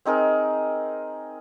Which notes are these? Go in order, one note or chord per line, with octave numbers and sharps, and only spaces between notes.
C4 D#4 G#4 A#4